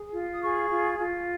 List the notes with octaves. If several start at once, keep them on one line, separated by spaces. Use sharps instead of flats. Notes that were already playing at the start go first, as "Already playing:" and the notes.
Already playing: G#4
F4
D#6
G#4 C#6
F4
F4